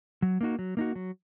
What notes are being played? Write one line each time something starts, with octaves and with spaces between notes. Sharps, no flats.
F#3
A#3 D#4 F#4
F#3
A#3 D#4 F#4
F#3